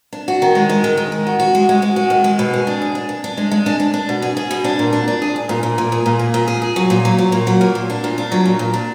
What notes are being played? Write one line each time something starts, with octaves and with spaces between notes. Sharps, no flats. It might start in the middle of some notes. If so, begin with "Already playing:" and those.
D4
F#4
D#3
G#3
G#3
D#3
D#3
G#3
F#4
F#4
G#3
G#3
G#3
F#4
D#3
G#3
B2
G#4
D4
G#4
D4
D4
D4
G#3
G#3
D4
D4
D4
B2
G#4
G#4
B2
D4
A#2
D4
D4
G#4
G#4
A#2
A#2
A#2
G#4
A#2
G#4
A#2
G#4
G#4
F#3
A#2
F#3
F#3
A#2
F#3
A#3
A#2
D4
A#2
D4
F#3
A#2
A#2
D4